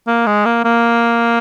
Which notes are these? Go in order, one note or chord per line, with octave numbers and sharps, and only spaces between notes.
A#3
G#3
A#3
A#3